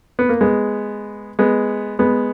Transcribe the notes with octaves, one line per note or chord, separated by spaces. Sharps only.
B3
A#3
G#3 B3
G#3 B3
G#3 B3